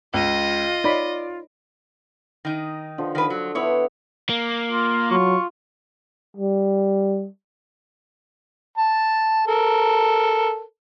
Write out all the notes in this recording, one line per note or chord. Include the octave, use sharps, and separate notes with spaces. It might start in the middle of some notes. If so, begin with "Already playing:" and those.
C#2 F4 D#5
D#4 C#5 D5 B5
D#3 D#4
D3 F3
D#3 B4
F#3
B3 D4 E4 C#5
A#3
F4
F#3 F4 C#6
G3
A5
A4 A#4